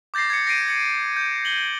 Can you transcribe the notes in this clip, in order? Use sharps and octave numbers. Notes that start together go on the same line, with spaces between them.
D6 G6 A6 A#6 C7
G#6 A6 C#7
A#6 C7 D7 D#7
A6 C#7
G6
F#7 G7